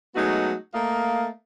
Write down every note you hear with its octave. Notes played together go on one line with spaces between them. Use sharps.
F#3 G#3 A3 B3 D#4 F#4
A3 A#3 D#5 F5